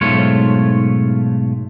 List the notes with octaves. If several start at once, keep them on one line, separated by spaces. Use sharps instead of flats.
B1 G#2 A3 F4 C#5